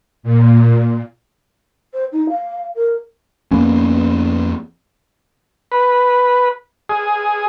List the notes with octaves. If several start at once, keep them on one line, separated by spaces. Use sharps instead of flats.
A#2
C5
D#4
F5
A#4
F2 A#3 B3 C#4
B4
G#4